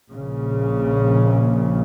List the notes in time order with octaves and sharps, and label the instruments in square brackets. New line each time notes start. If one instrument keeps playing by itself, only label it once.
[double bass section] A#1 A#2 C#3